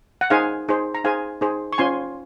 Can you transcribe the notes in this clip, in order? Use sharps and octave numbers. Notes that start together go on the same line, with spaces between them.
F#5
D#4 G#4 C5 F5 G#5
D#4 G#4 C5
A#5
D#4 G#4 C5 F5 G#5
D#4 G#4 C5
C#6
C#4 F4 C5 G#5 C6